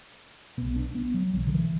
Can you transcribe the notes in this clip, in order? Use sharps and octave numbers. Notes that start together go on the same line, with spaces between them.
B1 B2 B3
D4
B3
F#3
B1 B2 E3 F#3
D3
E3